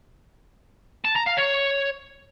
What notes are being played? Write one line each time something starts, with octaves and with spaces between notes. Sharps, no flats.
A5
A#5
F5
C#5